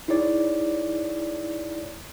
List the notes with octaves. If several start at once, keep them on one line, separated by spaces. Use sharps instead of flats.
D#4 E4 G#4 C#5 D5